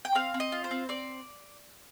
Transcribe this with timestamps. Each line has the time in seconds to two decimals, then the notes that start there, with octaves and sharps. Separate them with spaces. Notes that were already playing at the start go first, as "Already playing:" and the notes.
0.05 G5
0.15 C4 F5
0.34 C4
0.40 D#5
0.52 F4
0.64 C5
0.71 C4
0.89 C4 D5